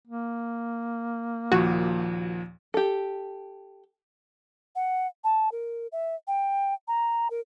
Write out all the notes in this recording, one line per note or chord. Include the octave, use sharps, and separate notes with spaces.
A#3
D#2 A#2 F3 F#4
G4 A4
F#5
A5
A#4
E5
G5
A#5
A#4